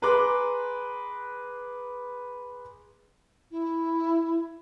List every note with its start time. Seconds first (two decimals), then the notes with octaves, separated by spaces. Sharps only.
0.02 G#4 B4 A#5 C6 D6 F#6
3.50 E4